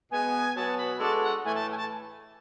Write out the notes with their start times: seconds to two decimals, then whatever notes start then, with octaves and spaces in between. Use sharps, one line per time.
0.11 B2 G#3 B3 G#5
0.55 B2 F#3 B3 F#4 B4 A5
0.77 B5
0.99 G#3 D4 F#4 A4 A5
1.22 F#5
1.43 A2 E3 A3 G#5
1.55 A5
1.71 G#5
1.77 A5